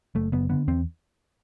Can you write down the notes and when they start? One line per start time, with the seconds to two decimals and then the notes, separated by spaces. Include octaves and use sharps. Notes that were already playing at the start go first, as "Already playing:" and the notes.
0.15 F#1 A3
0.32 F#1 B3
0.49 D3 B3
0.68 E2 C4